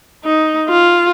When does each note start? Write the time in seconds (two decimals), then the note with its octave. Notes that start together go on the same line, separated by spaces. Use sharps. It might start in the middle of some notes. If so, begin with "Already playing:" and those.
0.24 D#4
0.69 F4